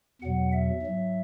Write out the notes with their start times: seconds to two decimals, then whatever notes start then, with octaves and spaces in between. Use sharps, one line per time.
0.22 E2 B2 F#3 F#5
0.52 E5
0.82 G#2 F#3